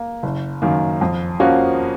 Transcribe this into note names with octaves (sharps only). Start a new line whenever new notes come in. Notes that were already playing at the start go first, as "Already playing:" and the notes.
Already playing: A#3
F#1
F#2 D#3 A#3
F2
F3 A#3 C#4 F#4